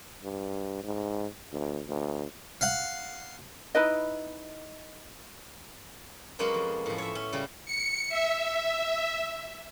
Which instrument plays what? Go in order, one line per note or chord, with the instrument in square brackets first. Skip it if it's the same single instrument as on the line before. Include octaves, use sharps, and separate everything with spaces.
[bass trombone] G2
G#2
D2
D2
[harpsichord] F5 F#5
[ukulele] D#4 E4 B4 D#5
[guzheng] F#3 G#3 A#3 B3 C#4
F2
A2 F3
C#5 E5
C#4
C#3 G3 G#4
[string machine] C#7
E5